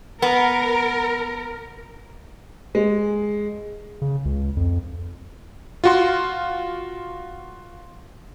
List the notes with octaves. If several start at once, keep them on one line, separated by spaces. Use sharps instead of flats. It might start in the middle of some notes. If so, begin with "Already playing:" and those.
B3 A#4
G#3
C#3
C#2
F2
F4 F#4 C6